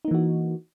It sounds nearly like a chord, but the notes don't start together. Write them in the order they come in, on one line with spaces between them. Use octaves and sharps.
D#4 A#3 E3 F#4